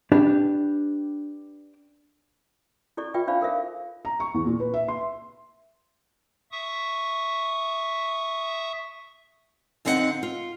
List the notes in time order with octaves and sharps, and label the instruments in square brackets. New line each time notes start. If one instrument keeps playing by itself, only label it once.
[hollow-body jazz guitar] D4 G4 B4
[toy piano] E4 A4 D5 C#6
F4 B4 D5 E5 G5 C#6
D4 D#4 C5 D5 F5 B5
A4 A#4 C5 E5 F5
[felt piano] A#5
C#6
E2
A#2
B4
E5
C6
[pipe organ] E5 C#6 D#6
[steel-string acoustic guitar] F2 D3 C4 D#4 F4 F#5
F4